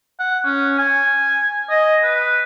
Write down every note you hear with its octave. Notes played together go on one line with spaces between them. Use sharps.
F#5
C#4
G#5
D#5
B4